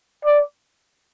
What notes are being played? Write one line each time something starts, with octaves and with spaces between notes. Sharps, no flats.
D5